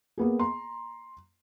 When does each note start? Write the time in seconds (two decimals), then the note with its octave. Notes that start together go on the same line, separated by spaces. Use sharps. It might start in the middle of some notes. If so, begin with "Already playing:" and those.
0.18 A#3 B3 G#4
0.39 A#5 C6